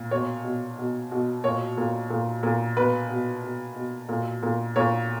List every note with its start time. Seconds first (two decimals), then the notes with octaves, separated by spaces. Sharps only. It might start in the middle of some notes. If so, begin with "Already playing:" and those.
Already playing: A#2
0.11 B2 C#5
0.44 B2
0.78 B2
1.12 B2
1.44 A#2 C#5
1.77 A#2
2.10 A#2
2.43 A#2
2.76 B2 B4
3.10 B2
3.44 B2
3.76 B2
4.09 A#2
4.43 A#2
4.76 A#2 C#5